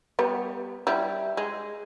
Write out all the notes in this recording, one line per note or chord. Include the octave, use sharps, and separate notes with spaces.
G3 B3
G3 E4
G#3